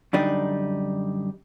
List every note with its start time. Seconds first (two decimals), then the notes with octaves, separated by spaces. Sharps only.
0.13 F#2 D3 G3 D4 D#4